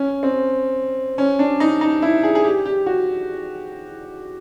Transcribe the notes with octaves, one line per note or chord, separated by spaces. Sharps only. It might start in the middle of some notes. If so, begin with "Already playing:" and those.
Already playing: C#4
C4
C#4
D4
D#4
D#4
E4
G#4
G#4
G4
G4
F#4